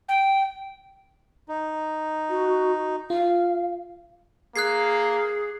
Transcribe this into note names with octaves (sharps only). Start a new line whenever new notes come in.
G5
D#4
F#4
F4 F5
A#3 G#4 F#6 G#6 C7